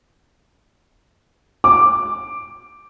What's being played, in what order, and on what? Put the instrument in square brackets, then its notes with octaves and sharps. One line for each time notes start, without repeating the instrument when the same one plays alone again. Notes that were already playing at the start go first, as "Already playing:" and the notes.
[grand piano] D6